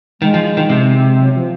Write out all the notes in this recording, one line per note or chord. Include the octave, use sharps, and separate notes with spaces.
D#3 G#3
F3
D#3
C3
F#3
F3